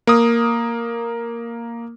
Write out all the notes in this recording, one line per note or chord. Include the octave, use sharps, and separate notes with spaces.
A#3 D#6